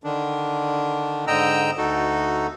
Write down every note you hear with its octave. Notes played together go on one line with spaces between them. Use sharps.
D3 D#3 D4
G#2 D3 D#5 G5 A#5 E6
D2 D#4 F#4 A4